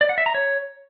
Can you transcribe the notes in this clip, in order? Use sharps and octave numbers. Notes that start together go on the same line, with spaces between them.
D5
F#5
E5
A#5
C#5